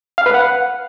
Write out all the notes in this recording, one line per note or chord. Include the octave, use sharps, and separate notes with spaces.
F5
B4
F#5